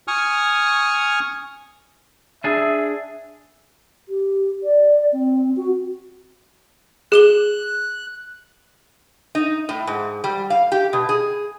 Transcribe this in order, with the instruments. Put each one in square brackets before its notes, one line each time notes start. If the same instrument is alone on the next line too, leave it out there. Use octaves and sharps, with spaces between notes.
[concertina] G#5 C#6 D#6 F6
[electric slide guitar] D4 G#4 [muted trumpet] E5
[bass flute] G4
D5
C4
F#4
[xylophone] G#4 E7 G7 [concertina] F#6
[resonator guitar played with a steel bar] D#4
A2
G#2
G3
F5
G4
B2
G#4